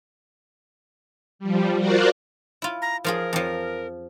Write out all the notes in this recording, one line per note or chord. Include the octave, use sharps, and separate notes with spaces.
F3 G3
F4 F#4 A#4 C5 D5 F#5
E4 F4
A#5
F3 F4 G#4 A#4
F2 F3